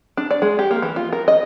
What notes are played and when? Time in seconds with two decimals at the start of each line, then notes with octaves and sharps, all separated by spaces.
0.17 D4
0.31 D5
0.42 G#3
0.59 G4
0.71 A#3
0.82 E3
0.96 F4
1.13 A#4
1.28 D#5